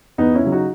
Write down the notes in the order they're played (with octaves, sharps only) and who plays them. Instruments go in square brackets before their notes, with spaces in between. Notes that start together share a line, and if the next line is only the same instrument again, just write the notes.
[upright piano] E2 B3 D#4
C#4 E4
C#3 F#3
D#4 F#4